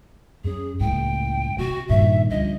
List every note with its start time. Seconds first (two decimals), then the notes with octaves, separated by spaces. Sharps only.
0.44 F#2 C#4 G#4
0.80 F#1 C#2 A2 A#3 G5
1.58 C3 F#4
1.89 G2 A#2 D#3 E5
2.30 C#2 D3 E3 F3 G3 D#5